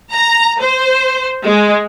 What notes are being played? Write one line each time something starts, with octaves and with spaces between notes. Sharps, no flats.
A#5
C5
G#3